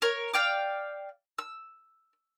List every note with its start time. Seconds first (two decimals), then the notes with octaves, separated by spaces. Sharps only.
0.02 A#4 C#5
0.34 D5 F5 G5 D6
1.38 E6